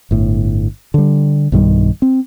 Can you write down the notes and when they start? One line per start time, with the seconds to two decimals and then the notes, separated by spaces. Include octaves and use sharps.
0.11 G1 A2
0.94 D3 G3
1.52 B1 G2 D#3 G3
2.02 C4